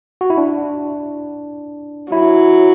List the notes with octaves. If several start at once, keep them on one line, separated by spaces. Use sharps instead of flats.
F#4
E4
D4
F#3 E4